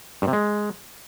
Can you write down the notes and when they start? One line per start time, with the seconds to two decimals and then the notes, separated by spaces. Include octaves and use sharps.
0.22 G2
0.28 C3
0.33 G#3